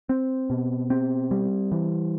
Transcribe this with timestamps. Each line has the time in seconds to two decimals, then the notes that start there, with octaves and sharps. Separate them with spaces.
0.09 C4
0.50 B2
0.90 C4
1.31 G3
1.72 E3